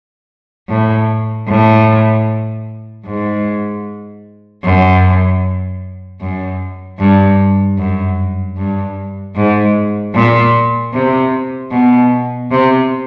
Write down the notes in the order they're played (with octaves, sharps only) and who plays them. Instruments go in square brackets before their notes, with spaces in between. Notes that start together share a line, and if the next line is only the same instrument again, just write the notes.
[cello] A2
A2
G#2
F#2
F#2
G2
F#2
G2
G#2
A#2
C3
B2
C3